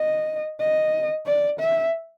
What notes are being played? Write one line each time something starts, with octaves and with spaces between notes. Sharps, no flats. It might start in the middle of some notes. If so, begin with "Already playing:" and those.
Already playing: D#5
D#5
D5
E5